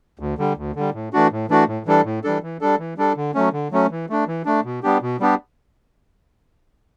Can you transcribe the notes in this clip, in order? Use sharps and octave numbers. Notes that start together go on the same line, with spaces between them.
D2
D3 G3
D2
D3 G3
A2
E3 A3 D4 F#4
A2
E3 A3 D4 F#4
A2
E3 G3 D4 A4
A2
E3 G3 D4 A4
E3
G3 D4 A4
E3
G3 D4 A4
D3
F#3 A3 C#4
D3
F#3 A3 C#4
E3
A3 D4
E3
A3 D4
B2
G3 B3 D4 G4
B2
G3 B3 D4 G4